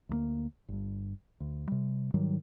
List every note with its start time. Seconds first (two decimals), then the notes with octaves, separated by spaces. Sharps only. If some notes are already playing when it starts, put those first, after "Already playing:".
0.09 D2 F#3 A#3
0.69 G1 G2
1.40 D2
1.67 C3 G3
2.14 G#2 D#3 F#3 G3